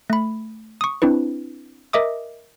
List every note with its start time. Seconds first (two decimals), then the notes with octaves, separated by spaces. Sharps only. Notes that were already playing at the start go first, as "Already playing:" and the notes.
0.10 A3 B5
0.81 C#6 D#6
1.02 C4 D4 E4 B4
1.93 A#4 D#5 E5 D6 D#6